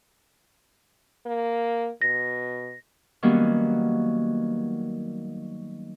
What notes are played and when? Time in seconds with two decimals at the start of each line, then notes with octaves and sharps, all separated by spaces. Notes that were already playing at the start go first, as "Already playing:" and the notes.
1.26 A#3
2.02 B2 A#6
3.22 D#3 F#3 G3 A#3 B3 C#4